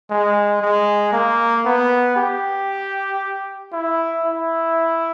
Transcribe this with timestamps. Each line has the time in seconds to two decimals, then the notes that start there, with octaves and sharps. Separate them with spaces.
0.10 G#3
0.61 G#3
1.13 A#3
1.65 B3
2.16 G4
3.72 E4
4.24 E4